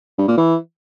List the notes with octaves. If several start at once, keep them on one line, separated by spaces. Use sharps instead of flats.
G2
A#2
E3